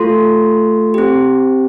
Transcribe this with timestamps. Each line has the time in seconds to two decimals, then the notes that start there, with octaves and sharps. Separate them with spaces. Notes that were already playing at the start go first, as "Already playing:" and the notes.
Already playing: A3 F4 A4 C6
0.94 C4 G4